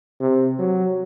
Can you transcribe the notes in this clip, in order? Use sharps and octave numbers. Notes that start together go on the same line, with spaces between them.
C3
F#3